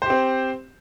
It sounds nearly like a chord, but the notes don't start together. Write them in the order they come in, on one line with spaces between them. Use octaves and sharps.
C5 G4 C4